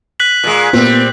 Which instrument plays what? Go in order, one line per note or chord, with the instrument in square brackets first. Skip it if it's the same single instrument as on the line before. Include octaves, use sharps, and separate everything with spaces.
[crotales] F#6 B6 F#7
[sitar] A#2 G#3
[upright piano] A#2 [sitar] G3 C4 [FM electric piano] B3